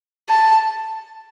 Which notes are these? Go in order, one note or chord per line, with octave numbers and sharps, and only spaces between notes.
A5